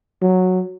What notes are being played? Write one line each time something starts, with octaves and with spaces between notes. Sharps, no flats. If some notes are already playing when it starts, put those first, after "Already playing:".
F#3